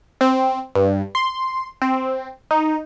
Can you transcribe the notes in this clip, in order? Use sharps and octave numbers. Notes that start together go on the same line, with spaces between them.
C4
G2
C6
C4
D#4